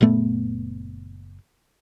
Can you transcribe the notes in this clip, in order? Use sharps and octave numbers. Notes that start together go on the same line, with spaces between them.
F#1 A#2 A3 B3